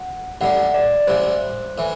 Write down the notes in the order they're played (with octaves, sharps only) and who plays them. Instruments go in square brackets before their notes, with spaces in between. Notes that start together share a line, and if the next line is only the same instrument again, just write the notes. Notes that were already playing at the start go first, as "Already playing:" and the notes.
Already playing: [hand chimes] F#5
[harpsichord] A1 A2 G3 [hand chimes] F#5
[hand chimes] D5
[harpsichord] A1 A2 G3 [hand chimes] C5
[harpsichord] A2 E3